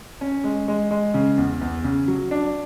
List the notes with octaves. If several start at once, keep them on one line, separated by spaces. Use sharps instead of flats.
C#4
G#3
G#3
G#3
C#3
E2
E2
C#3
F#3
D4